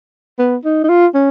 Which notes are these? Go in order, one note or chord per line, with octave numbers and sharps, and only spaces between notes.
B3
D#4
D#4
F4
C#4